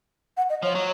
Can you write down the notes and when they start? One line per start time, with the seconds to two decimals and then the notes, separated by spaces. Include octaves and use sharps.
0.37 F#5
0.50 D#5
0.63 F3 C#5
0.75 F#3